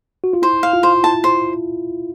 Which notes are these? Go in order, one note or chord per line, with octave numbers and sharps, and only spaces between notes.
F#4
F4
E4 C5
F5
F4
C5
E4 A5
C5